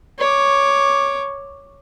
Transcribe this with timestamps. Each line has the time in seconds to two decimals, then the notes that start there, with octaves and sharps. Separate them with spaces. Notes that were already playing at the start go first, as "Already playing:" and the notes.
0.19 C#5 D6